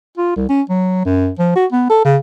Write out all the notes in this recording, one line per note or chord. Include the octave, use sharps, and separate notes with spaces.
F4
C2
C#4
F#3
F#2
F3
F#4
B3
A4
C#3